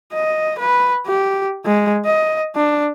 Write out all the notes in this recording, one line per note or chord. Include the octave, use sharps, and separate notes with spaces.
D#5
B4
G4
G#3
D#5
D4